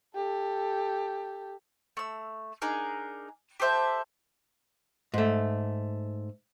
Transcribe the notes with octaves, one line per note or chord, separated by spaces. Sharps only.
G4 A4
A3 E6
D4 D#4 G#4 A#4
G4 A4 C5 E5
G#2 A3